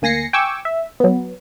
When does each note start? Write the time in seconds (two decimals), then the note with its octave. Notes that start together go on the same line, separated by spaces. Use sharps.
0.02 D2 A#3 G#5 A#6 C7 C#7
0.33 G5 G#5 C#6 D6 E6
0.65 E5
1.00 F#3 B3